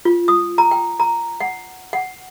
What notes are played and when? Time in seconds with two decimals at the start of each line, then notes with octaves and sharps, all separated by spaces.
0.05 F4
0.28 D#6
0.58 A#5
0.71 G5
1.00 A#5
1.40 F#5
1.93 F#5